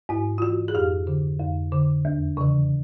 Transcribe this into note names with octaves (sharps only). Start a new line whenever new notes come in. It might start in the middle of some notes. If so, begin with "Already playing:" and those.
G#2 E4
F4
E3 F#4
G#4
F2 G4
D3
F2
D3
E2
C#3 E3